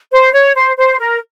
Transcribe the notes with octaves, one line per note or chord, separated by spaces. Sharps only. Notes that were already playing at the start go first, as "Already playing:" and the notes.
C5
C#5
C5
C5
A#4